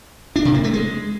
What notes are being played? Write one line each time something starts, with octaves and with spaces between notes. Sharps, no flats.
D4
C3
A#3
A3
G#3